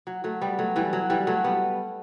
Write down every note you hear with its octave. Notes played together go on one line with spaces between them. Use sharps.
F#3
F#3 A3
G3 B3
F#3 A3
E3 G3
F#3
E3 G3
F#3 A3
G3 B3